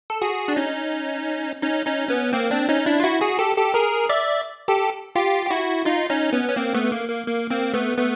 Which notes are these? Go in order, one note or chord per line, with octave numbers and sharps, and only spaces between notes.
A4
F#4 G#4
D4
C#4 D#4
C#4 D#4
C#4 D#4
B3 C#4
A#3 C4
C4 D4
C#4 D#4
D4 E4
F4
E4 F#4
F#4 G#4
G4 A4
G4 A4
G#4 A#4
D5 E5
G4 A4
F4 G4
G4
E4 F#4
D#4 F4
C#4 D#4
B3 C#4
C#4
A#3 C4
A3 B3
A#3
A#3
A#3
A#3 C4
A3 B3
A3 B3